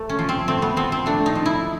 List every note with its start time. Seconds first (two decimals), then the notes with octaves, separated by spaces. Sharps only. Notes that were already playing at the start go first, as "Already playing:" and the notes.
Already playing: A3
0.09 C#4
0.19 F3
0.29 C4
0.48 A3 C4
0.62 B3
0.77 F3 C4
0.92 C4
1.06 A3 D4
1.26 D#4
1.35 F3
1.46 E4